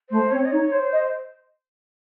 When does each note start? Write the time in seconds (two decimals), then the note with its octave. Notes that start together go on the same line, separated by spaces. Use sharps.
0.10 A3 C5
0.31 C4 C#5
0.45 D#5
0.52 D#4 C#5
0.72 C5 C#5
0.93 D#5